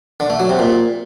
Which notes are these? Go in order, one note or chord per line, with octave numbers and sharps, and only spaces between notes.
D3
A3
F#3
C3
A#2